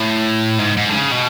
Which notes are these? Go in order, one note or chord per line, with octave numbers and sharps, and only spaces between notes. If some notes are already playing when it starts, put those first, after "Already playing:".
Already playing: A2
G#2
G#2
D3
C#3
B2